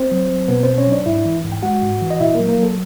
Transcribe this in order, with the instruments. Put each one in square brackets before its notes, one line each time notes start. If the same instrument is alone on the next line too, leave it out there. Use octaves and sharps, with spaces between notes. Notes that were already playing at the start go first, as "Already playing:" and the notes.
Already playing: [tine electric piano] C4 C5
F#3
F#3
B2 B3 B4
B2 C4 C5
C#4 C#5
F#3
D4 D5
G#2 E4 E5
E3
G#2
G5
G#3 F#4 F#5
G#2
E3
D#5
A#2 E4 E5
A#3 A#4
F#3
A#3 A#4
F#3 A4